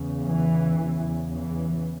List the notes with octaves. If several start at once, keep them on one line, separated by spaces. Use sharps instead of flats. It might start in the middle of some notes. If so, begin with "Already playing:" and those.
Already playing: E2 C#3
E3
E2 C#3
E3